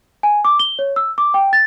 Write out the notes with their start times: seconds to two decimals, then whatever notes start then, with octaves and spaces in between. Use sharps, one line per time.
0.23 G#5
0.45 D6
0.60 G7
0.79 C#5
0.96 E6
1.18 D6
1.34 G5
1.53 A6